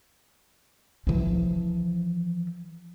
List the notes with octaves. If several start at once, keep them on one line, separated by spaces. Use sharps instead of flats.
E3 F3